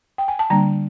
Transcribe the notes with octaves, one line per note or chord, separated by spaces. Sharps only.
G5
G#5
A5
D3 G3 A#3 D4 A#5